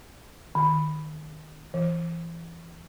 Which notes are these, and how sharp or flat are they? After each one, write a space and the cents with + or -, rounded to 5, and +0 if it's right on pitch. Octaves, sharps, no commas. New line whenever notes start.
D#3 -15
E3 +25